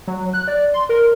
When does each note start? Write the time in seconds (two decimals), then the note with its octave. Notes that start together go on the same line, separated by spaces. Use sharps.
0.07 F#3
0.34 F#6
0.48 D5
0.74 C6
0.89 A#4